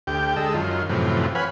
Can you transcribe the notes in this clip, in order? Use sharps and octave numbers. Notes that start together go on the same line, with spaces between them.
D2 G4 G5
D3 G#3 A4 D#5 E6
F#2 D#3 F4
F#2 A2 C3 E3 F3
B4 C#5 F5 F#5 G#5 B5